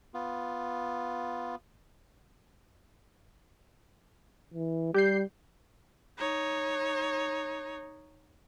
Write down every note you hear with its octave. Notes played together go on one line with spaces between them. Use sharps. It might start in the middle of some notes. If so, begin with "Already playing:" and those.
B3 F4
E3
G3 G4 G6 C7
D#4 C#5